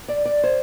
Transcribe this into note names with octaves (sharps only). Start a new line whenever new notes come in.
D5
D5
C5